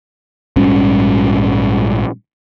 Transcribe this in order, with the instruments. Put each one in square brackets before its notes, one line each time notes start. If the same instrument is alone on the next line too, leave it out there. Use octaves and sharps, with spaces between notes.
[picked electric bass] A#1 G#2 G3 C#4